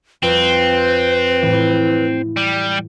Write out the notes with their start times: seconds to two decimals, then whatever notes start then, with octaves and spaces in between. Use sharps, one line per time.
0.23 F2 C4 B4
1.42 A2 E3
2.37 G3